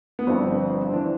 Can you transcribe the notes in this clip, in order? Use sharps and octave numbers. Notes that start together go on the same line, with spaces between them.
B3
G1 G2 F3 C4
C4
E3 D4